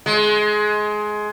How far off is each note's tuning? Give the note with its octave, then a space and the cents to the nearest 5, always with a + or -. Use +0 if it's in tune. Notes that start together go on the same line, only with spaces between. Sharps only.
G#3 +20